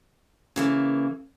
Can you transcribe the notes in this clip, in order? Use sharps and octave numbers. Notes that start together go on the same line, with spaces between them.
C#3 E3 A#3